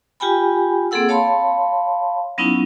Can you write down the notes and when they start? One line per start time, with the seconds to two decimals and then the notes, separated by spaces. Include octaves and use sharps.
0.20 F4 G4 G5 G#5 B5
0.91 A#3 C4 G#4 A4 F#5 E6
1.09 C#5 F5 A5 B5 C6
2.38 F#3 B3 C#4 D#4 E4